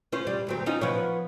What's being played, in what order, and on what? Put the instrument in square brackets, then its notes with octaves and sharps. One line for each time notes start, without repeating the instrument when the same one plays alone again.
[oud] C#4 F4 C5
G3
D2 F#3 C4
C#4 D#4 F4
F3 B3 C#5